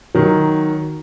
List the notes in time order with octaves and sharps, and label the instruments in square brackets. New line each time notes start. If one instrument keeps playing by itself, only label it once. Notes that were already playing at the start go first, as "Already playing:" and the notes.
[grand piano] D#3 F#3